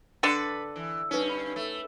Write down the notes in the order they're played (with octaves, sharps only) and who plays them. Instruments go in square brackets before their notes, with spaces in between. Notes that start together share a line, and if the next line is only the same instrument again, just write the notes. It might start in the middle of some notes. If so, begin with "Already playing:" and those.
[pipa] D3 D4 A4 [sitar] B4
[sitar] E3
[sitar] G2 C#4 [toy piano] D#4 B4
[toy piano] B5
[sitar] A3